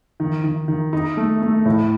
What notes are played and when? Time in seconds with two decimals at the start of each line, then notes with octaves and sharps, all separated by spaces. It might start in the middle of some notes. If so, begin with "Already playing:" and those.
0.20 D#3
0.44 D#3
0.68 D#3
0.93 D#4
1.17 A3
1.42 A3
1.65 A2